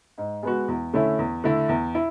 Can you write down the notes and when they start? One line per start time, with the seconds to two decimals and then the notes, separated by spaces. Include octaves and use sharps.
0.18 G#2
0.43 G#3 B3 F#4
0.68 E2
0.93 D3 A3 C#4 E4
1.19 E2
1.44 D3 A3 E4
1.69 E2
1.95 E4